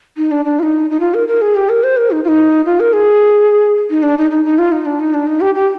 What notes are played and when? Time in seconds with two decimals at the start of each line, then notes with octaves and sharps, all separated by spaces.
0.17 D#4
0.31 D4
0.45 D4
0.59 F4
0.63 D#4
0.90 D#4
1.00 F4
1.14 A#4
1.28 A#4
1.41 G#4
1.55 G4
1.69 A#4
1.83 C5
1.97 A#4
2.11 D#4
2.24 F4
2.28 D#4
2.66 F4
2.80 A#4
2.93 G#4
3.90 D#4
4.03 D4
4.18 D#4
4.31 D#4
4.45 D#4
4.58 F4
4.72 D#4
4.86 D4
5.00 D#4
5.14 D4
5.27 D#4
5.41 G4
5.55 G4